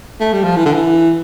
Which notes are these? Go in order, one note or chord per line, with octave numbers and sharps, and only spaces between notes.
A3
G3
F3
E3
D3
E3